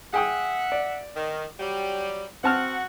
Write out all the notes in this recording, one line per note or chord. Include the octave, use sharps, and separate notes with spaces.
G#4 E5 F#5 G5 D#6
D5
D#3
F#3 G3
C4 F#4 F#5 A5 F6